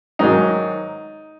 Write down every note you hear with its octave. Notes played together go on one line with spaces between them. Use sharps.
G#2 D#3 F#3 D#4